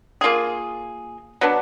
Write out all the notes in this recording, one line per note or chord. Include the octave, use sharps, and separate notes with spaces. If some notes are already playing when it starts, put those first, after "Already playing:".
A#3 F4 G#4
F#3 B3 D4